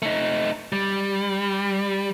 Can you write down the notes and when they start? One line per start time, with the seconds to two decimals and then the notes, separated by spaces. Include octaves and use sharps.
0.02 A3 D#4
0.72 G3